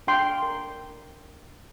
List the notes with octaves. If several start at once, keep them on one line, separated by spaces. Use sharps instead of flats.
D4 G5 C6
A#4